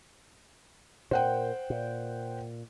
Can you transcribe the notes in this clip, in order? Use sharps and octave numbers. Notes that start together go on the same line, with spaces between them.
A#2 C5 F#5 G5
A#2